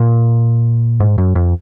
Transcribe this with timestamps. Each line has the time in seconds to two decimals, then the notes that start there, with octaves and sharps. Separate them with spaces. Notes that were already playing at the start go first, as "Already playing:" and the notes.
Already playing: A#2
1.00 G#2
1.18 F#2
1.35 F2